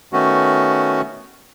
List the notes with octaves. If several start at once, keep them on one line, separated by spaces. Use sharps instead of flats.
D#3 A3 B3 C#4 F#4